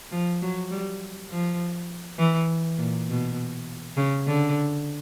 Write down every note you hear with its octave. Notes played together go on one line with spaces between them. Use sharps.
F3
F#3
G3
F3
E3
A#2
B2
C#3
D3